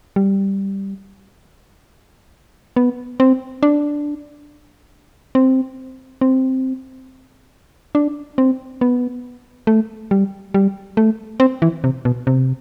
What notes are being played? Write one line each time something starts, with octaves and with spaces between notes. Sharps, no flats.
G3
B3
C4
D4
C4
C4
D4
C4
B3
A3
G3
G3
A3
C4
E3
C3
B2
C3